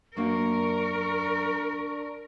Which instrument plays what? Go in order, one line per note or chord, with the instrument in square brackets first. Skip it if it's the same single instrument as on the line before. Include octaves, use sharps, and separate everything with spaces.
[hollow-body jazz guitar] F#2 A#3 [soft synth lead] D4 [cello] A#4 [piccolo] C#6